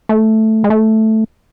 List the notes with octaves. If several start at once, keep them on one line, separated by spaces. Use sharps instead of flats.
A3
G#3
A3